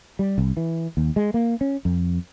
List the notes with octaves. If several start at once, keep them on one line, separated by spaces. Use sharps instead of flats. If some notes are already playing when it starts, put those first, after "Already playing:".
G3
C2
E3
D#2
G#3
A#3
C#4
F2